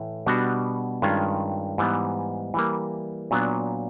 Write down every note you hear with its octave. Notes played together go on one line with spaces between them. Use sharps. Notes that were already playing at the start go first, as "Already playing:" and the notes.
Already playing: A2 E3 A3
B2 G3 B3 D4 F#4
G2 D#3 G#3 C#4 F4
G#2 E3 G3 B3
E3 G3 A#3
A#2 F#3 B3 D4